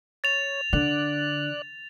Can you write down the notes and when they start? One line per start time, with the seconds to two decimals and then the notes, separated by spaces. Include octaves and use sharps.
0.24 C#5 A6 F7
0.73 D3 D5 F#6